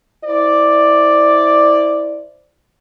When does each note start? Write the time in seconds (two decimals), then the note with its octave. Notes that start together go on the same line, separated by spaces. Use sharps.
0.25 E4 C5 D5